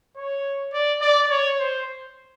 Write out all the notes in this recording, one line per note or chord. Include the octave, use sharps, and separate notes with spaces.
C#5
D5
D5
C#5
C5